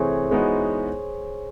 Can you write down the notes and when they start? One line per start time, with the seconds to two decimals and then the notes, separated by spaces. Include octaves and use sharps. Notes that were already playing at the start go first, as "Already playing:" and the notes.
Already playing: C3 E3 A3 G#4 C5 C#5
0.31 E3 G#3 B3 D#4 F#4